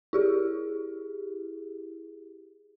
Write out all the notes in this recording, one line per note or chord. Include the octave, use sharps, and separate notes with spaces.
E4 G4 G#4